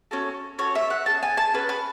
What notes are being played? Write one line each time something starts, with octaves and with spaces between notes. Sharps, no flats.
C#4 F#4 A4
C#4 F#4 A4 C#5
E5
F#5
C#4 G#4 A5
G#5
A5
C#4 G#4 B4
B4